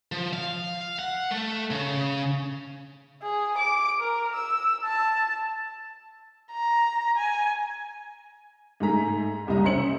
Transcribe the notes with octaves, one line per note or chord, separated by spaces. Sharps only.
F3
F5
F#5
A3
C#3
G#4
D6
A#4
E6
A5
A#5
G#5
G#2 A3 G#4 A#5 B6
F#1 C2 G3 D#5 A#5
C#4 C5 E5 C#7 F#7